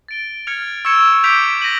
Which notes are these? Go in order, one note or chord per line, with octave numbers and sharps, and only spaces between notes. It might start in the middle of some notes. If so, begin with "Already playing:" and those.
A6 D7 G7
F6 G#6 C#7 F7
C#6 E6 G#6 C#7 E7
D6 G6 B6 D7 F7
A#6 D#7 F#7